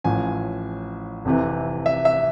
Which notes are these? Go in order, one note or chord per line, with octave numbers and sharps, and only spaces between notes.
A1 A2 F3 G#5
F1 F2 C3 E3
E5
E5